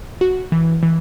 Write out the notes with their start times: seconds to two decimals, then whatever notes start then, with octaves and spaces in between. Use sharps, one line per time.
0.21 F#4
0.52 E3
0.83 E3